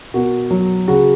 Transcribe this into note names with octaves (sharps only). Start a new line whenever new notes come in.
B2 F#4 A#4
F#3
C#3 F#4